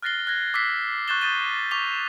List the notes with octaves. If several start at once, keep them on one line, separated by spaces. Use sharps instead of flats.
F6 F#6 A6 A#6 C7 G7
F#6 G#6 A#6
D6 E6 F#6 B6 C7
C#6 F#6 G6 A6 E7 G7
C#6 D#6 G6 A6 D#7 G7
C#6 D6 B6 F7 G7